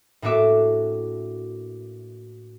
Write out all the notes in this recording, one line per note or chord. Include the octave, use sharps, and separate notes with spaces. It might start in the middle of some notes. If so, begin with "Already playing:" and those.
A2 A#3 D4 F#4 E5 D6